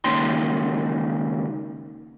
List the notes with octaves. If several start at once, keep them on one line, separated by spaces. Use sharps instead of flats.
C#2 D#3 A#3 C#4 G5 C6